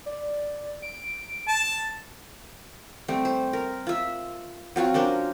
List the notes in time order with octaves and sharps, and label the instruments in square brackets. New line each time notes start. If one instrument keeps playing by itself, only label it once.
[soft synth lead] D5
D7
[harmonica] A5
[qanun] G3 A3 C4
C5
A#4
F4 E5
F#3 C4 F4 F#4
C#4 D4 A#4 C5